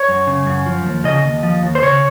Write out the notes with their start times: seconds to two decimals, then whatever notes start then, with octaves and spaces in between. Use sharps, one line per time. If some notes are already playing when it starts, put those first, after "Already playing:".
Already playing: C#5
0.09 F#2
0.27 C#3
0.46 F#2
0.66 F3
0.86 D#2
1.04 C#3 D#5
1.25 D#2
1.43 F3
1.63 D#2
1.75 C5
1.83 C#3 C#5